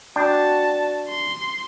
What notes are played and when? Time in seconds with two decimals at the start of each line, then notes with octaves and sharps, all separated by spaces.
0.16 D4 F#4 G5 A5
1.08 C6